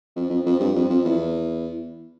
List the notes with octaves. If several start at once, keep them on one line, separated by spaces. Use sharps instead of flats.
F2
F2
F2
G2
F2
F2
E2